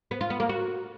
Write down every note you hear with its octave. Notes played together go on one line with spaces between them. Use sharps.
B3
F4
B3
A#3
F#4